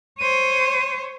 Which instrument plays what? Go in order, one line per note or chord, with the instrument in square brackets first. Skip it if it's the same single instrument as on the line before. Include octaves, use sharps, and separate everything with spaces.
[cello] C5 C#5 [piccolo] D#7